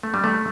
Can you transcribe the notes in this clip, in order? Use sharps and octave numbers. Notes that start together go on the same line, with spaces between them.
A3
G3
A3